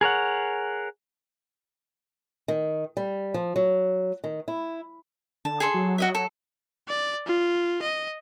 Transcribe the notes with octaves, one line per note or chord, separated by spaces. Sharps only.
G#4 A#4 C#5 F#5
D#3
G3
F3
F#3
D#3
E4
D3 A5
G#4 A4 C6
F#3
F#4 D#5 E5
A4
D5
F4
D#5